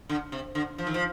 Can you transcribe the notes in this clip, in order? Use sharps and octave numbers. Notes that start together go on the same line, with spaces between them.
D3
C3
D3
F3
D#3
F3